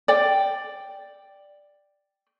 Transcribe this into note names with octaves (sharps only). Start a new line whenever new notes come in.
D5 G5